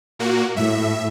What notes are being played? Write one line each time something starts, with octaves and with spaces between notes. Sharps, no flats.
A#2 A#3 F#4
A2 E5